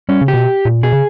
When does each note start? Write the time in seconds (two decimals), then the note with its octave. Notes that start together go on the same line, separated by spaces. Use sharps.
0.09 G3 C#4
0.22 C#3
0.28 G4
0.34 B2
0.65 A#2
0.83 B2 G#4
0.92 C#3